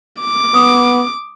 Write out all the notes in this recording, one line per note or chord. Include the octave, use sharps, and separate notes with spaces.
D6
B3 D#6